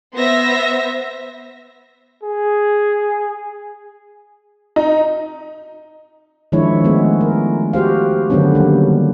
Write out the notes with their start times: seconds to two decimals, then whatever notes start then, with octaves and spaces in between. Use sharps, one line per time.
0.15 B3 C5 E5 A#6
2.23 G#4
4.76 D#4
6.52 D#3 F3 G#3 D4 E4 C#5
6.84 G#3 A3 B3
7.21 A#4
7.73 F#4 G4 C5 F5
8.30 D3 D#3 F#3 B3 C#4 D4
8.55 G3 A#3